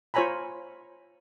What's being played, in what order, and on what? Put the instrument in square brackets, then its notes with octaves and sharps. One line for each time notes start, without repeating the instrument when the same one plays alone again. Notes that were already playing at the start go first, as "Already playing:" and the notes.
[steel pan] F4 C5 C#5 G#5 A#5 B5